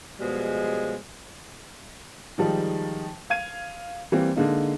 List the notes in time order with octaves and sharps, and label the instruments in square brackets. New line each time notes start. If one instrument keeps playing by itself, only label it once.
[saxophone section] B2 F3 G3 G#3
[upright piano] D#3 F3 G3 G#3 D#4
F5 G#6 D#7
E3 G3 A#3 C4
D3 G#3 A#3 D#4